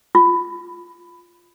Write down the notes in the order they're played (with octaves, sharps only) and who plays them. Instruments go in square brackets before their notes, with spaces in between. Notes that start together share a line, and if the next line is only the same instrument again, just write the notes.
[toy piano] F4